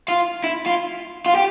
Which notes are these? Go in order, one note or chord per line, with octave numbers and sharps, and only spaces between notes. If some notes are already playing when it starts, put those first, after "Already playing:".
F4
E4
F4
F4
G4